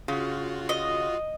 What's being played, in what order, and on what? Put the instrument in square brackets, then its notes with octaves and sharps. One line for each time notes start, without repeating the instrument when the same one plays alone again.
[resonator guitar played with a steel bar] C#3 [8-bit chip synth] F4 F#4
[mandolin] D#5